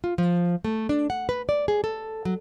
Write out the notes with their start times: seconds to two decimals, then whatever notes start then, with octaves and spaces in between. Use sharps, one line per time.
0.04 F4
0.18 F3
0.65 A3
0.89 D4
1.10 F#5
1.29 B4
1.49 D5
1.68 G#4
1.84 A4
2.25 F#3